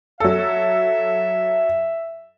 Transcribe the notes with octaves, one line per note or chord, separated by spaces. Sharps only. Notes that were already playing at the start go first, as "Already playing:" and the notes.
F#3 A4 E5